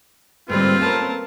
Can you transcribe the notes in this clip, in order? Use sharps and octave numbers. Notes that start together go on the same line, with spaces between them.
G#2 D3 G3 A#3 C4 F4 B4
A3 C#4 A#4 A5